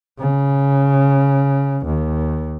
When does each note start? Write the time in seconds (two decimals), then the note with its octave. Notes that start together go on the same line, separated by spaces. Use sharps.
0.19 C#3
1.85 D#2